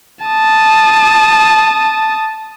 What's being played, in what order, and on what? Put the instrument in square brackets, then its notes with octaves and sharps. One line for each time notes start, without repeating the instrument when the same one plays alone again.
[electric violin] A5 D#6